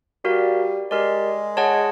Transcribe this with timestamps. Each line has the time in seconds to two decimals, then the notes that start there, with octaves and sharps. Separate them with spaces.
0.24 G3 F#4 A#4 D5 F5
0.91 G#3 G4 A#4 D5
1.57 G#4 C#5 F#5 A5